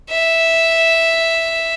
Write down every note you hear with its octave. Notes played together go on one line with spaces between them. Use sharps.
E5